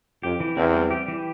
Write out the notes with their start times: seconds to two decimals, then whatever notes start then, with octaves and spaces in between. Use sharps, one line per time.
0.23 F2 G4
0.40 E3
0.56 E2 C4
0.74 G3
0.91 G4
1.08 E3